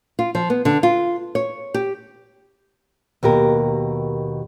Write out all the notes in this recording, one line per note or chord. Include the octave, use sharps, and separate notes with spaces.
F4
F3
B3
D3
F4
C#5
G4
D#2 B2 G4 A#4